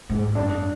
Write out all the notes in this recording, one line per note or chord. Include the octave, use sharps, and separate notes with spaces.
G#2
G2
F#2 D4